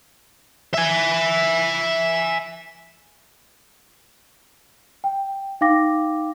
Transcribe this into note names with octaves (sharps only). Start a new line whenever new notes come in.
E5 G#5
G5
D#4 F5 G5 D6 A#6